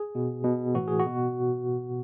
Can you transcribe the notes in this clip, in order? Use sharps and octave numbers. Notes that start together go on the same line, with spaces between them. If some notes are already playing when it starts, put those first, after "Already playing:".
Already playing: G#4
B2
B2
A2 E3 F#4
G#4
F#4
B2